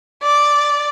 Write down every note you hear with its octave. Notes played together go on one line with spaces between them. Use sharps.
D5